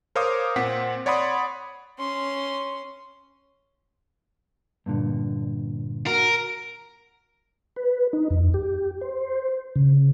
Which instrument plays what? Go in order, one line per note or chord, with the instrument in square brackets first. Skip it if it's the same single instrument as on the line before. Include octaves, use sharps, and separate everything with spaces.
[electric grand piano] A#4 C5 C#5 F5 D6 D#6
A#2 C4 F#5 B6
C#5 D5 F#5 B5 C6 D#6
[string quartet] C#4 C6
[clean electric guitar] G2 A#2 D3
[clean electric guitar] F#4 [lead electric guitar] A#4
[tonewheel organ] B4
D#4
F2
G4
C5
C#3